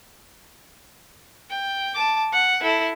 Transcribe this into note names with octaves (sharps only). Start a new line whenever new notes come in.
G5
A5 D6
F#5
E4 A4